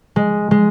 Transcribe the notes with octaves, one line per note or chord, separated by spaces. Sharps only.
G#3
G#3